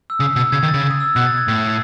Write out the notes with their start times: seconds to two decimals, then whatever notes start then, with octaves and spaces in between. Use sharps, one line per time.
0.10 E6
0.20 C#3 D#6
0.36 B2 E6
0.52 C#3 G#6
0.63 D#3
0.68 A6
0.74 C#3
0.90 D#6
1.00 E6
1.16 B2 F#6
1.27 A6
1.38 G#6
1.48 A2